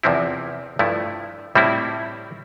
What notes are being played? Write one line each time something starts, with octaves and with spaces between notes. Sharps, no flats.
E2 C3 F3 C4 E4
G2 F3 A3 E4
A2 G3 C4 E4